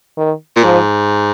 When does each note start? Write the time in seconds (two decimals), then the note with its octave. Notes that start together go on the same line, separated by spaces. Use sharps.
0.18 D#3
0.56 A#2
0.64 G#2 F3